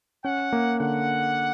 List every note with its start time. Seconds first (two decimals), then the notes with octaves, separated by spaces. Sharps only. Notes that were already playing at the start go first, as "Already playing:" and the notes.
0.25 C#4 F#5
0.53 A#3
0.80 D3 F#5